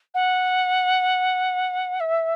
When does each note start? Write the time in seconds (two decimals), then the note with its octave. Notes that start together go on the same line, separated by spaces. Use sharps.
0.14 F#5
2.00 E5